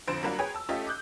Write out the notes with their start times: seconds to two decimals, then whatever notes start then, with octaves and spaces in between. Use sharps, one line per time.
0.08 A#1 F2 D3 C5 D7 E7
0.23 F#3 G3 A#3 D4 F#4
0.39 G#4 B4 C#5 G5 G#5
0.54 A5 E6
0.69 A3 C#4 F4 G4 A4 D#5
0.87 D6 D#6 F#6 G6